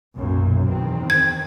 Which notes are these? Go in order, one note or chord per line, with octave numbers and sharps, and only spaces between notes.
B1 F#2 A#2
E2 D#3 C4
G#6